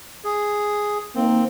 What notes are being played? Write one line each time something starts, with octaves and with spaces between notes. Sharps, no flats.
G#4
D#3 A#3 C4